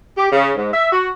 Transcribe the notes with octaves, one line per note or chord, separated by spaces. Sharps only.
G4
C#3
G#2
E5
F#4